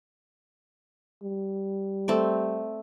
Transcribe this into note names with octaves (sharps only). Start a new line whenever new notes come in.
G3
A3 C4 D5